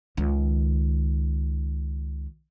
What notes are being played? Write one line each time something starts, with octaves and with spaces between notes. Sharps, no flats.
C#2 D#3